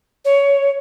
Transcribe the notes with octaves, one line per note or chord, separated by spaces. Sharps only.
C#5